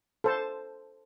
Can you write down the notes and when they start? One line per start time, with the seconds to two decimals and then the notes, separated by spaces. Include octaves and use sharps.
0.24 A4 C5 A5